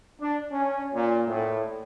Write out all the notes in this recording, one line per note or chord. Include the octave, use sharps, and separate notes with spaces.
D4
C#4
A#2
A2